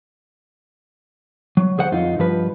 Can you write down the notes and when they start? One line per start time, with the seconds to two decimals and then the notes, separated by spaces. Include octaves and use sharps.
1.57 F#3
1.78 D2 G#4 C5 F#5
1.92 F2 D#4 F4
2.19 G2 F3 B4